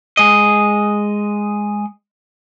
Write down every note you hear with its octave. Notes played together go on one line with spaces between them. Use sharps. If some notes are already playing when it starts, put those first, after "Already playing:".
G#3 D#5